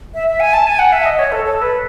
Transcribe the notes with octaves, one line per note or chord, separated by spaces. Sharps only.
E5
E5
G#5
A5
G#5
F#5
E5
D#5
C#5
A4
A4
B4